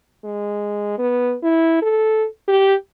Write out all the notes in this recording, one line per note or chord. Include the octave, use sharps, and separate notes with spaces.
G#3
B3
E4
A4
G4